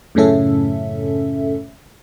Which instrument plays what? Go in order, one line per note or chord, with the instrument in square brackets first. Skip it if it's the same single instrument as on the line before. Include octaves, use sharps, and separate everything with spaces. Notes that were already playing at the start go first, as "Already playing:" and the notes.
[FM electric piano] F#2 A2 C#3 C#4 A4 E5